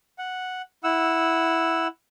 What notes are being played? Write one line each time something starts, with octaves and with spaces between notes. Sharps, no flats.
F#5
E4 F#5 E6